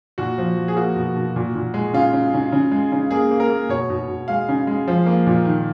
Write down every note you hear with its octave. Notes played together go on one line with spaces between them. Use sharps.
A#2 F#4
F3
F3
G#4
A#3 F#4
B2
B2
A#2
A#2
G#3
C#3 F4
C#3
C#3
C#3
G#3
C#3
A#3 G#4
A#3
A#4
A#3
B2 C#5
B2
B2
G#3 F5
C#3
G#3
F3
A#3
A#2
D#3